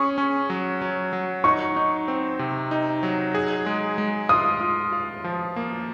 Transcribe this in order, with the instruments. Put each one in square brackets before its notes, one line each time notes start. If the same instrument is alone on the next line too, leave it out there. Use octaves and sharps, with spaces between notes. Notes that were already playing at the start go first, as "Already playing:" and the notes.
Already playing: [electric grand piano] C#4 G#4 [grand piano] C#6
[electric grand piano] C#4
F#3
F#3
F#3
[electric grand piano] D#4 [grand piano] C#6
[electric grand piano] D#4
C4
C3
D#4
F#3
G#4
G#3
G#3
[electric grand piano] F4 [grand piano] D#6
[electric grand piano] F4
F4
F3
A#3